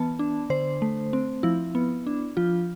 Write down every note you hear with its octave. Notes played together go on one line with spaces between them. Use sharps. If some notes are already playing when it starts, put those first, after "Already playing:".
Already playing: E3 B3 A5
D4
D3 C5
A3
C4
F3 E4
B3
D4
F3 F4